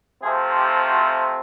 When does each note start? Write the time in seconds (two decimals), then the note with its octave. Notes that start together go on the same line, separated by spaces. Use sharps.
0.22 C3 F3 A3 C4 G#4
0.57 G4
0.91 F#4